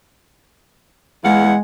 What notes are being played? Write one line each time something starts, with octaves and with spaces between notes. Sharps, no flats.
E2 G#3 F5 F#5